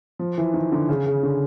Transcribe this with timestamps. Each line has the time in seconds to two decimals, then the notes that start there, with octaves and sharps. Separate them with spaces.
0.19 F3
0.38 E3
0.54 D#3
0.72 D3
0.89 C#3
1.06 C#3
1.23 D3